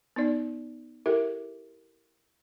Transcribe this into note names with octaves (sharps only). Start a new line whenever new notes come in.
B3 D#4 D5
E4 G4 A4 A#4 E5